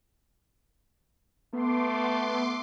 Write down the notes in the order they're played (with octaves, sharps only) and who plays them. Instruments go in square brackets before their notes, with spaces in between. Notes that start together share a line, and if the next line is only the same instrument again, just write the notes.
[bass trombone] A3 [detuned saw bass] B3 [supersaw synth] C6 D6